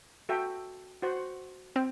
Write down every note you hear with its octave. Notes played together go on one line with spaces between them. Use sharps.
F#4 A4 E5 G5
F#4 C5 F#5
C4 G5